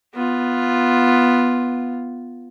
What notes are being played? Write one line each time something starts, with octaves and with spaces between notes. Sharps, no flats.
B3 F4